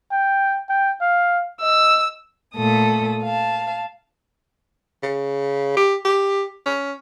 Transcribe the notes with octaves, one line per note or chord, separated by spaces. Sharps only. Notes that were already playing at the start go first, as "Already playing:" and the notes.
G5
G5
F5
D#5 E6
A#2 A3 A4 D#6
F5 A5
C#3
G4
G4
C#4